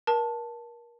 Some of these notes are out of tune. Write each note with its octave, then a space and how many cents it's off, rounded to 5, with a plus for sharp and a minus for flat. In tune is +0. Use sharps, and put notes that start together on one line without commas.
A#4 +30 A5 +0